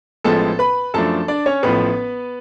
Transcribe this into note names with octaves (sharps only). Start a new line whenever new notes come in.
A1 A2 F3 G#3 B3 A4 A5
B4 B5
F#2 F3 A3 D4 A4 A5
D4 D5
C#4 C#5
A1 A2 F3 B3 B4